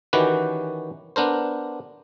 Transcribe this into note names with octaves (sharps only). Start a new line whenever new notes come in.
D#3 E3 C#4 F#4 G4 B4
B3 D4 A#4 C5